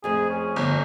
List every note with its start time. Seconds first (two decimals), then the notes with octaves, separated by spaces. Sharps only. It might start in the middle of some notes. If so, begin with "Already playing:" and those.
0.04 F2 F3 A3 G#4
0.30 C#4
0.56 G1